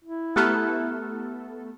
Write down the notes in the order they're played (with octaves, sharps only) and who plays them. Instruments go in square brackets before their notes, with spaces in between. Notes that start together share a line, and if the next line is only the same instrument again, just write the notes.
[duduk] E4
[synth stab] A3 B3 A4 [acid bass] G4 [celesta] A#5 F6 F#6